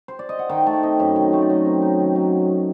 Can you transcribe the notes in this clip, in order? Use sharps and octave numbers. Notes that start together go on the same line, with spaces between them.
C5
D5
D#5
F#5
D#3 G5
A3 A5
C4 D#5
F#2
D#3
A3 C5
D5
F#3 D#5
C4
D#4
D#3
F#3